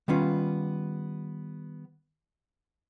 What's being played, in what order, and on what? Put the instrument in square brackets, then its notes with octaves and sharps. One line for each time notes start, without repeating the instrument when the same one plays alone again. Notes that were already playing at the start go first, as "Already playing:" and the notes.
[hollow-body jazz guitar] D#3 G3 B3 C#4 F4